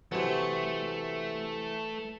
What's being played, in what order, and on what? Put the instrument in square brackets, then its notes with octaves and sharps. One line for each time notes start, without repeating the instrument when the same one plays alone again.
[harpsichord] C3 F#3 [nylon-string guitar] E3 [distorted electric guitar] A3